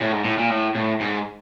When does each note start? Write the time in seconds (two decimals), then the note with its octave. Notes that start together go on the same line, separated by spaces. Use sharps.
0.01 A2
0.12 G#2
0.25 A2
0.38 A#2
0.50 A2
0.75 A2
1.01 G#2